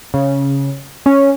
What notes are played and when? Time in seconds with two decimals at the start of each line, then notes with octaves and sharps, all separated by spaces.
0.14 C#3
1.06 C#4